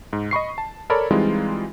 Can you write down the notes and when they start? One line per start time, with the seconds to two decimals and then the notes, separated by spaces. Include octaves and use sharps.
0.13 G#2
0.31 D#5 B5 C#6 C7
0.58 A5
0.90 A4 A#4 C#5 D5 B5
1.11 E3 G3 G#3 C4 D#4 F4